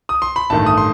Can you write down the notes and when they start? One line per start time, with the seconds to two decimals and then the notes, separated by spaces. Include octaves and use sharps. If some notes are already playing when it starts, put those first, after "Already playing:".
0.09 D#6
0.22 C6
0.36 B5
0.50 A1 G2 D#3 A3 A5
0.66 D#6
0.77 C6